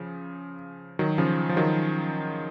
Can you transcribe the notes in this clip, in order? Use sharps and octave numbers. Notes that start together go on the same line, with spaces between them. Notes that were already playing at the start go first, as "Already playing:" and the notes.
Already playing: C#3 F3
D#3 F#3
C#3 F3
F3
D#3 F#3